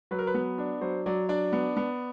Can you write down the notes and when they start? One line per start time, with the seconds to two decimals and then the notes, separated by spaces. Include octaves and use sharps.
0.11 F#3 B4
0.18 A#4
0.27 B4
0.35 B3
0.58 D4
0.81 F#3 C5
1.06 F#3 D5
1.29 D4 D5
1.53 B3
1.77 B3